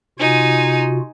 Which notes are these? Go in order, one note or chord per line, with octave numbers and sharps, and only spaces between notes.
C3 D#4 F4 F#4 G#5